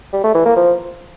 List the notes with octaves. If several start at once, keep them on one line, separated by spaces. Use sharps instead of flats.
G3
A3
E3
A#3
F3